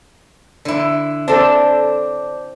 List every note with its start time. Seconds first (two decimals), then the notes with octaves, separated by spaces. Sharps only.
0.65 D3 E4
1.28 C4 D4 A4 C5